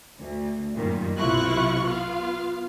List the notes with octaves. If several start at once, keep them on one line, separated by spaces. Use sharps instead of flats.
D2
F#2 A#2 D#3 G3
B1 C3 E4 F4 C#6 F#6
B3 F4 F5